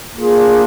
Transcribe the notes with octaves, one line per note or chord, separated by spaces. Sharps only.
A#3 D4 F4 G#4